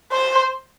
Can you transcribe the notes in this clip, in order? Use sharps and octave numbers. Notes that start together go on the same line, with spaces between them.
C5